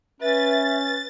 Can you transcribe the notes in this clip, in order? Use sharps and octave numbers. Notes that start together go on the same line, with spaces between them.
C#4 B4 E5 A6
B4